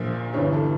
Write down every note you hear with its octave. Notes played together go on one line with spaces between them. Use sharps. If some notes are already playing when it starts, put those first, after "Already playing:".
Already playing: A#1 A#2 F3 A#4
G1 G2 E3 C#5
A4